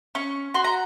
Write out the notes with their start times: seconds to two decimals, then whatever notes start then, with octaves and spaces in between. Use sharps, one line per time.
0.15 C#4 C#6
0.54 F#4 C6
0.64 A#5